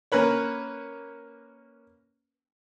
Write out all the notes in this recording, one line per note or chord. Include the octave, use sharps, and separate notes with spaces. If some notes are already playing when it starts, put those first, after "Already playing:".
A#3 C#4 A#4 B4 C#5